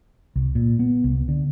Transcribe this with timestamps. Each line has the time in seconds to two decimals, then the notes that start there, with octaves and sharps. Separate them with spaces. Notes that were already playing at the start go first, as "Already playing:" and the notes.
0.36 C2
0.55 A#2
0.79 B3
1.04 C2
1.28 D3